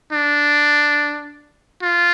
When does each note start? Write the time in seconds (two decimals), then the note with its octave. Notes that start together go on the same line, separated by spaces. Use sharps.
0.12 D4
1.82 F4